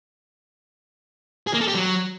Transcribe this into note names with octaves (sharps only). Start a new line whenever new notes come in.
G#4
A#3
A4
G4
F#3